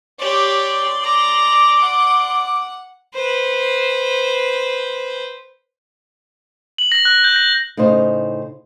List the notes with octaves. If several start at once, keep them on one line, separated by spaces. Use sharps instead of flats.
G4 C#5 D5 C6
A#5 D6
F#5
B4 C5
F#7
A#6
F#6
G6
A#6
A2 C#3 D#4 C5